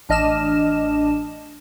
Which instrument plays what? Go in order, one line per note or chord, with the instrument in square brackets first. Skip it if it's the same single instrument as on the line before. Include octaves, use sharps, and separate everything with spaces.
[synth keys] A1 D4 D#5 F6 E7